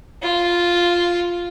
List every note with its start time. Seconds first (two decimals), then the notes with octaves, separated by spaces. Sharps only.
0.22 F4